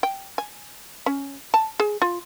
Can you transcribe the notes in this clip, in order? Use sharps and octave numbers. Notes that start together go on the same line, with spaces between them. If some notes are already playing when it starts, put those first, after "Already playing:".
G5
G#5
C#4
A5
G#4
F4